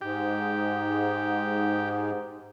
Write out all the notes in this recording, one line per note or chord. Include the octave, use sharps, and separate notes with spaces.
G#2 G4